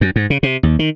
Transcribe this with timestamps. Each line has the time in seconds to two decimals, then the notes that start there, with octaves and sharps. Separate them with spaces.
0.01 F#2
0.16 G#2
0.30 C#3
0.43 C3
0.63 D#2
0.79 D#3